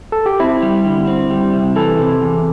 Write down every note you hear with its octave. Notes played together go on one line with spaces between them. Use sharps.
A4
G4
C4 E4
G3
D3
C4
G3
C3
E3 A4
C3
E2